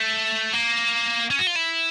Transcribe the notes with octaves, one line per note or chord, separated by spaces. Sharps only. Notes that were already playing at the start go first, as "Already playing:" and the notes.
Already playing: A3
A#3
C#4
F#4
F4
E4